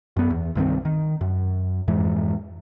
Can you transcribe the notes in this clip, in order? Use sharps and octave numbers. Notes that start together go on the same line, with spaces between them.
F#2 B3
E2
C2 G2 D#3 C4
D#3
F#2
F2 G#2 E3 G#3